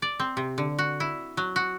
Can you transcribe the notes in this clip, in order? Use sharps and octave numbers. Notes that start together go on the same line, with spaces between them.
D5
C4
C3
D3
F#4
E4
F#3
F#4